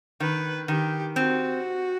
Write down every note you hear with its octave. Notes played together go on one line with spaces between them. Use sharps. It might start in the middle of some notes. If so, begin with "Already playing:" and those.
D#3 B4
D#3 G4
C4 F#4